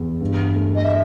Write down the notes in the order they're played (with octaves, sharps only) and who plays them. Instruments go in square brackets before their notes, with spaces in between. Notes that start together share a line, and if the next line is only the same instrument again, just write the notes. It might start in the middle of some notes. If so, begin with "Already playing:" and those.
Already playing: [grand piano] E2
G2
A3
[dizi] D#5
E5